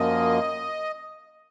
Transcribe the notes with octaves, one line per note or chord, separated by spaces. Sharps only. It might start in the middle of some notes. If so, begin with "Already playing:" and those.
Already playing: F#2 F3 A#3 D#5